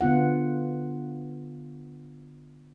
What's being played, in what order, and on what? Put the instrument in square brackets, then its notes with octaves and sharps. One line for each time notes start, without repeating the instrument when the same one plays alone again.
[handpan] D3 B3 F4 F#5